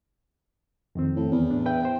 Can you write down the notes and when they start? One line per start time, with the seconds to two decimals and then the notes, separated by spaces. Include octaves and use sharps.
0.95 F2 D#3 C4
1.16 A2
1.32 E2
1.51 A2 D4
1.66 B4 E5 G5
1.83 C5 G5